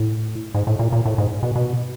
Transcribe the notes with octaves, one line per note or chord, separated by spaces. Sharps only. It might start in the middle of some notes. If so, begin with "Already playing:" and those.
Already playing: A2
G#2
A2
A#2
A#2
A2
G#2
B2
B2